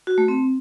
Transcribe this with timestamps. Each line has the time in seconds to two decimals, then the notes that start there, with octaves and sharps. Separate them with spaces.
0.07 F#4
0.18 A3
0.28 C4